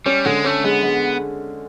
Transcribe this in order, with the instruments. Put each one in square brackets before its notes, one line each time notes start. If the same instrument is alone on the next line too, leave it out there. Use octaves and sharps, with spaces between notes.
[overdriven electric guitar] G3 [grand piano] C#4
[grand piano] D3 [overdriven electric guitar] G#3
[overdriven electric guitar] A3 [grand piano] C#4
[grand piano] G#3 [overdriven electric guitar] B3
[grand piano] G#3